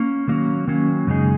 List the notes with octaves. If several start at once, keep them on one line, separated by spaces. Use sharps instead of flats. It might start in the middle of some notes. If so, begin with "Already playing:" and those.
Already playing: A#3 C#4
D#3 F#3 A#3 C#4
D#3 F#3 A#3 C#4
F#2 C#3 G#3 D#4 G#4